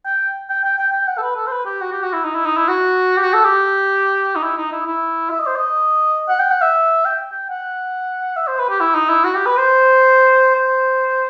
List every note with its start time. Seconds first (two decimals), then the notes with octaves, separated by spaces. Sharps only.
0.06 G5
0.49 G5
0.64 G5
0.79 G5
0.93 G5
1.08 F#5
1.17 A4
1.22 B4
1.37 A4
1.47 C5
1.52 B4
1.66 G4
1.81 F#4
1.92 G4
2.03 F#4
2.13 E4
2.25 D#4
2.35 E4
2.46 D#4
2.57 E4
2.68 F#4
3.17 G4
3.23 F#4
3.33 A4
3.45 G4
4.36 D#4
4.43 E4
4.57 D#4
4.72 E4
4.87 E4
5.30 E5
5.39 D#5
5.47 C5
5.56 D#5
6.29 F#5
6.40 G5
6.51 F#5
6.62 E5
7.05 G5
7.32 G5
7.49 F#5
8.36 E5
8.48 C5
8.59 B4
8.70 G4
8.81 E4
8.95 D#4
9.10 E4
9.24 F#4
9.35 G4
9.46 B4
9.57 C5
10.55 C5